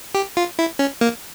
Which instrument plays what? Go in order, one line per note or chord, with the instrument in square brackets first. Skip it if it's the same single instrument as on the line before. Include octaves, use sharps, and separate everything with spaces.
[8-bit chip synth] G4
F4
E4
C#4
A#3